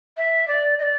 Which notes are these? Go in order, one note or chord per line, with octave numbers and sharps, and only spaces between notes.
E5
D5
D#5
D5